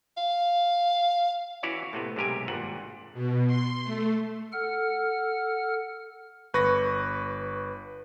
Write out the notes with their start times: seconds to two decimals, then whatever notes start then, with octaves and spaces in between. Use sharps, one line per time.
0.17 F5
1.63 E3 C#4 E4 F#4 C#5 D5
1.93 A2 C3 B3
2.16 B1 G#2 C3 G4 A#4 G#5
2.48 G#1 G2 A#2 F#5
3.14 B2
3.47 C6
3.84 A3
4.52 A4 F#5 F6
6.54 G1 B4 C#6 A#6